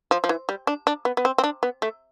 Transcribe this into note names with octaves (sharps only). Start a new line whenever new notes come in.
F3
F3
E3
G3
D4
D4
B3
B3
C4
C4
D4
B3
A3